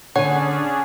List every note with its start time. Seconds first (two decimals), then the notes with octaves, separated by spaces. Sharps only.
0.16 D3 C#4 D4 G#4 C#5 F#5 G#5